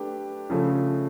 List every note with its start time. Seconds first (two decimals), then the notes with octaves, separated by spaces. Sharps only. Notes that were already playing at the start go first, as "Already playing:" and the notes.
Already playing: A3 D4 G4 B4
0.50 C#3 F3 A3